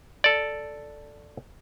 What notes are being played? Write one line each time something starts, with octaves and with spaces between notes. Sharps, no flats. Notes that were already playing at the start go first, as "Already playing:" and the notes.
A4 D5